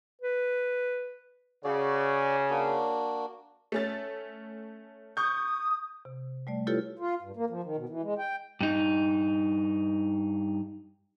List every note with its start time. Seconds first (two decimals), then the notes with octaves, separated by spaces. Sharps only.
0.21 B4
1.64 C#3 F#4 C#5 D5
2.49 A#3 D4 F#4
3.72 A3 C#4 A6
5.17 C#6 D#6 G6
6.05 C3
6.47 G3 A3 D5
6.67 E4 F4 G4 A4 B4 C#5
6.99 F4
7.22 G2
7.37 A#3
7.50 F3
7.63 D#3
7.76 B2
7.89 E3
8.03 G#3
8.19 G5
8.61 G2 D#4